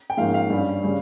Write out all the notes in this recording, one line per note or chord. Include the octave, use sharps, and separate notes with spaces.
G5
G#2 F3 A#3 C#4 F5
F5
G2 G3 C#4
C#3 G3 C#4